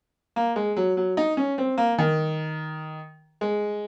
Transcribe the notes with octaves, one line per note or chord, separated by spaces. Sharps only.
A#3
G#3
F#3
F#3
D#4
C#4
C4
A#3
D#3
G#3